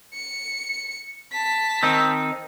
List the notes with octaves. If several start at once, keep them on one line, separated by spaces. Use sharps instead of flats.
C#7
A5 B6
D#3 C4 D#4